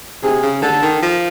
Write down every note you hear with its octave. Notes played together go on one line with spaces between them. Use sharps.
C3 G#4
C#3
D3 A4
D#3
F3